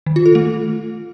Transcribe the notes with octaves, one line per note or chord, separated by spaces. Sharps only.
D#3
F4
A4
A3